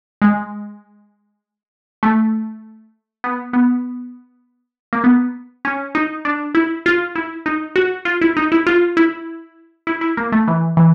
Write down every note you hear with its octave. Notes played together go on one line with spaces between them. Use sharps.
G#3
A3
B3
B3
A#3
B3
C#4
D#4
D4
E4
F4
E4
D#4
F#4
F4
E4
D#4
E4
F4
E4
E4
E4
A#3
A3
E3
E3